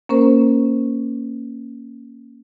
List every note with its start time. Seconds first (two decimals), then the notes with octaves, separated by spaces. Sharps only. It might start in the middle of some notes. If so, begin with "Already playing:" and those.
0.09 A#3 C#4 A#4 C5